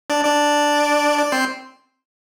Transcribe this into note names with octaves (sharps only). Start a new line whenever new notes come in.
D4 D5
D4 D5
D5
C4 C5